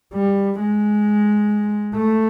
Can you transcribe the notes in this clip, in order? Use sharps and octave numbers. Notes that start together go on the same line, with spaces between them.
G3
G#3
A3